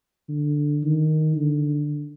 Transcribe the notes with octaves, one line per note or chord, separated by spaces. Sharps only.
D3
D#3
D3